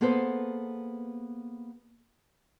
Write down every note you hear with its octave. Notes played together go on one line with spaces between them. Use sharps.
A#3 B3 G#4 A4 B4 C5